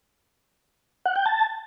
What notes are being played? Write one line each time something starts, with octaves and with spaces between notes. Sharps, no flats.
F#5
G5
A5